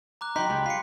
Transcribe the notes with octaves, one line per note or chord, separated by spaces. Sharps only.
A#5 D6 F#6
F#3 D#4 G5 B5 C6 B6
C#2 G#3 G4
F4 B6 C#7